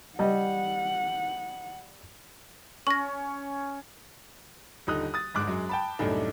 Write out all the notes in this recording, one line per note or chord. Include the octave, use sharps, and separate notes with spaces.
G3 D#5 F#5
C#4 C#6 A#6
D#1 D3 D#4 D#6 F#6
D#6 A6
G1 G#2 D6 F#6
F#2 F#3 G#3
G5 A5 B5
C2 F#2 A2 A3 D4 D#4